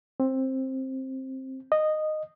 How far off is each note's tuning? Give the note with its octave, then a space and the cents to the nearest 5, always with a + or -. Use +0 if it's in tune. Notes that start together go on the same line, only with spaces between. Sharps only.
C4 +15
D#5 -10